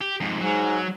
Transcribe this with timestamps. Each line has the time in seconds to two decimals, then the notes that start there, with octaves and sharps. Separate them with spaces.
0.02 G4
0.21 F2 G#2
0.41 G#2 F#3